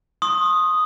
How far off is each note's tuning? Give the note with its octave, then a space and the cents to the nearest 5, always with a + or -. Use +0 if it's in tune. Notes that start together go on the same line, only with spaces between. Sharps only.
C6 +40 D#6 +0